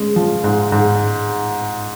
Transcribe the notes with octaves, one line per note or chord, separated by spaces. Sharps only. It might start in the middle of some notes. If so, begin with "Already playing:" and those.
Already playing: G#3 C#4
F3
G#2
G#2